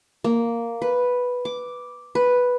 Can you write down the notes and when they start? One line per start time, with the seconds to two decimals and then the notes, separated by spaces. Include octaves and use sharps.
0.24 A#3
0.82 B4
1.45 D6
2.15 B4